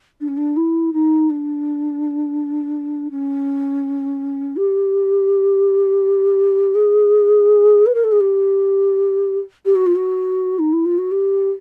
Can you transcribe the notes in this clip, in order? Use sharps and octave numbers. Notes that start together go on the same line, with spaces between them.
D4
C#4
D4
E4
D#4
D4
C#4
G4
G#4
B4
A#4
A4
G#4
G4
G4
F#4
F4
F#4
D#4
E4
F4
F#4
G4